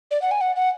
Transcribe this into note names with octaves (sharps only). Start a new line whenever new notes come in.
D5
F#5
G#5
F#5
F#5